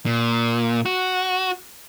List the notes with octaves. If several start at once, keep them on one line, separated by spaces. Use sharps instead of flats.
A#2
F#4